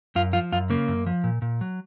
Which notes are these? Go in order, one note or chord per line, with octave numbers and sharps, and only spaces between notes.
F#2 F4
F3 F4
F#2 F4
C#3 A#3
F#2
F3
A#2
A#2
F#3